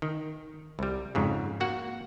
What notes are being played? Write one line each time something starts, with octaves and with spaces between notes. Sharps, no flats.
D#3
C2 G3
F2 G#2 C#3
A#3 F#4 F#5